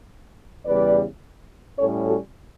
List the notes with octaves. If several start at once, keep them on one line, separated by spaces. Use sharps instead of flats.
E2 C#3 G3 B4 D5
A2 G3 C#4 A4 C#5
F#4 A4